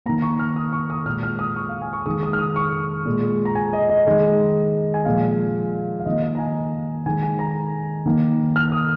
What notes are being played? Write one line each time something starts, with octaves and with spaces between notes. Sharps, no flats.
D#3 A#3 A#5
C#6
F6
D#6
C#6
D#6
A#2 G#3 F6
F6
D#6
C#6
F5
G#5
C#6
D#3 G#3 D#6
D#6
F6
D#6
C#6
A#2 G#3
A#5
G#5
D#5
D#5
D#3 G#3
G#5
A#2 F3 G#3 F5
F5
D#3 A#3 D#5
D#5
A#5
G#5
D#3 G#3 G#5
G#5
A#5
D#3 A#3
F6
D#6